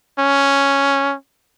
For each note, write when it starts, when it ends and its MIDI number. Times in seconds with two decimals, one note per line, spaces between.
0.19 1.14 61